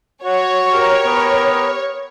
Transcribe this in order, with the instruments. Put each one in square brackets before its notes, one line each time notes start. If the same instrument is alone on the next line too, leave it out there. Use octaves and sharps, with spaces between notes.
[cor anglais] F#4 [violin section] C#5
[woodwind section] G4 A#4
[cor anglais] B3